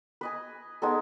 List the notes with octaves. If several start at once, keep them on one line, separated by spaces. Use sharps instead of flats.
B4 D#5 G#5
G#3 B3 D#4 A4